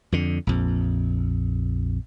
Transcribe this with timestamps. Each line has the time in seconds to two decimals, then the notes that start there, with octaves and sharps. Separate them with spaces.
0.12 F2 D3
0.47 A#1 F2